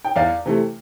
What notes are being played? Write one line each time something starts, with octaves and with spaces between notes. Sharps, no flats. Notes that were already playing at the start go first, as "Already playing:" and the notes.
G5
E2 D5 F5
C3 E3 A3